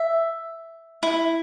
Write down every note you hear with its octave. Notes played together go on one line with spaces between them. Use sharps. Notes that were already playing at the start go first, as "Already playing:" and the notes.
Already playing: E5
E4